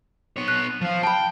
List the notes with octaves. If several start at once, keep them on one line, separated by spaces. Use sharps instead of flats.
B3 C#5
F#6
F3 F5
G5 A5 B5